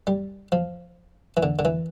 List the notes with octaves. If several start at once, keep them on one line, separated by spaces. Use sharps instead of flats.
G3
F3
E3
D3
D3
E3